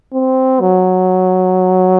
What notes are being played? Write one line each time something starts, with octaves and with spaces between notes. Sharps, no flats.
C4
F#3